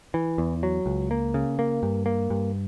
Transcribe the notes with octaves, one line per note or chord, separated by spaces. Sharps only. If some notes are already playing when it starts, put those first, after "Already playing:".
E3
E2
F#3
C#2
A#3
C#3
A#3
G2
A#3
G2